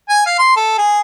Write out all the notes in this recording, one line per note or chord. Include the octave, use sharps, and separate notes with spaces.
G#5
F5
C6
A4
G#4